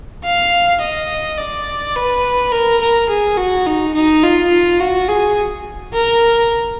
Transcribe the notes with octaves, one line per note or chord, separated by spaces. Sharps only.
F5
D#5
D5
B4
A#4
A#4
G#4
F#4
D#4
D#4
F4
F#4
G#4
A#4